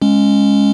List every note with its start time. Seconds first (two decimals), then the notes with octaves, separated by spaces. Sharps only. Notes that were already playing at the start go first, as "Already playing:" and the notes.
0.02 G#3 C#4